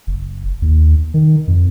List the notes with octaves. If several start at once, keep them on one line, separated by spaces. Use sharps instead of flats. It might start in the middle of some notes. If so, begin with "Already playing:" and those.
F#1
D#2
D#3
F2